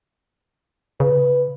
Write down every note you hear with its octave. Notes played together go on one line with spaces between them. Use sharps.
C#3 B4